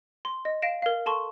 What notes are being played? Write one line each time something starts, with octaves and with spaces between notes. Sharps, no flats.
C6
D#5
F5 A#6 D7 E7
A#4 F5
A4 A5 C6 C#6